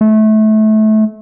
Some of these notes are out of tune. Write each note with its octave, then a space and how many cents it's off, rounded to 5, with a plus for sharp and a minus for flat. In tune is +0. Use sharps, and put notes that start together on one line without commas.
A3 -25